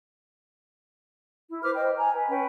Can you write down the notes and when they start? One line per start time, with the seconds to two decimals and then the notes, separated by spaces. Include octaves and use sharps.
1.50 E4
1.64 B4 C5 D6 F6
1.75 C5 D#5 G5
1.96 G#5 A#5
2.13 B4
2.29 C#4 B4 G5